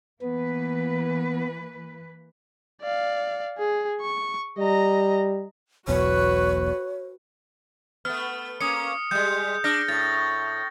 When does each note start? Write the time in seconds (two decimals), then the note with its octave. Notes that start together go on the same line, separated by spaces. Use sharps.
0.22 E3 A#3 B3 B4
2.82 D5 F5
3.58 G#4
4.01 C#6
4.59 G3 D#5 A#5
5.88 E1 B1 E2 F#4 B4 C#5
8.05 A3 B3 F6
8.61 A#3 C#4 D#6 C#7
9.11 G3 G#3 G6
9.64 D4 F6 A#6
9.88 A2 A6